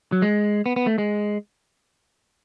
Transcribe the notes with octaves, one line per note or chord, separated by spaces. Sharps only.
F#3
G#3
B3
B3
A3
G#3